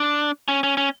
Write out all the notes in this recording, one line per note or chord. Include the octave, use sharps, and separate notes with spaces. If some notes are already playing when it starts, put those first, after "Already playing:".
Already playing: D4
C#4
C#4
C#4